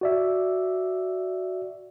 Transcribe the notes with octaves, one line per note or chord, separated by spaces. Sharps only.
F#4 D5 E5